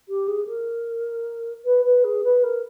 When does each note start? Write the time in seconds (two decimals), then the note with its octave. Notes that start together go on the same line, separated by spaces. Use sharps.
0.08 G4
0.28 G#4
0.47 A#4
1.65 B4
1.85 B4
2.04 G#4
2.24 B4
2.43 A#4